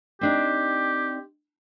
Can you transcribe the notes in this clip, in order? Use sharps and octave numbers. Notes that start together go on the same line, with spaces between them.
C4 D4 D#4 G4